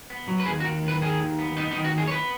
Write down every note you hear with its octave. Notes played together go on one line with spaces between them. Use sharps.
B3
F#3
B4
D#2 G#4
F#4
D#3
D#2 B4
D#3 G#4
D#2
B3
B3 D#4
D#4
D#3
F#4
D#2 G#4
C#5
B3 B4